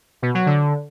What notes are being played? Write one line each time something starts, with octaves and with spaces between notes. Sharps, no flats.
B2
F#3
D3